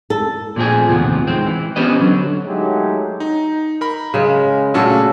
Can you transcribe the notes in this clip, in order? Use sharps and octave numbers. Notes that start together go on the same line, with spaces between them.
A4
A#2 F3 A3 C4 G#4
D#2 A2 C3 E3 F3 B3
D#3 G#3 C4
E3
B3 C#4 G4 B4 C5 D#5
D3 F#3
F#3 G#3 A3 D#4 G4
D#4
A#4 B5
C#3 G#3
A#2 C#3 A3 C#4 F#4 A4